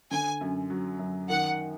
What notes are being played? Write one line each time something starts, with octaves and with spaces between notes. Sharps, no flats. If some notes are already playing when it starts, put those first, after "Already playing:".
D3 G#5
F#2
F#3
F#2
D#3 F#5